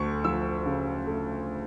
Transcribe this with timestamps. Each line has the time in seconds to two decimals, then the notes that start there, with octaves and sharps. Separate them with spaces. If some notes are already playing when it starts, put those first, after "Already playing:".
Already playing: D2 A3 C#6
0.24 F3 E6
0.66 C#3
1.07 A3